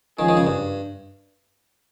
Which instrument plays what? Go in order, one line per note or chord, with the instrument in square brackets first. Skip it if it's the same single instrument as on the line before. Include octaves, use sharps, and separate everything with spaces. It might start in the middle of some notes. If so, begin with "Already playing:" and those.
[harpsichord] D#3 [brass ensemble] F3 G#3 C#4 F4 G#4
[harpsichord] D#3
C#3
G2